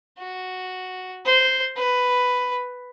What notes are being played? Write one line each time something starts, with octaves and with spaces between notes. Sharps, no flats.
F#4
C5
B4